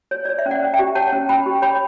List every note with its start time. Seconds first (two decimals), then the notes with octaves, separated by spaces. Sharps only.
0.11 C#5
0.25 C#5 D5
0.39 E5
0.46 C#4
0.51 D5 F#5
0.63 C#4
0.74 E5 G5
0.79 G4
0.95 C#5 F#5 A5
1.12 C#4
1.29 C#4 G5 B5
1.46 G4
1.62 C#5 G5 B5